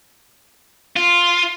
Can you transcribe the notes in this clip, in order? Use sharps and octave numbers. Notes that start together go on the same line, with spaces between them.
F4